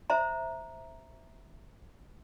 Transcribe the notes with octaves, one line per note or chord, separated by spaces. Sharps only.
C5 E5 A#5